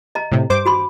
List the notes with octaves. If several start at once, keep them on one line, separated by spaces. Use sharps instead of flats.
D#5 A#5
A2 C3
G2 C5 D6
F#4 B5 C6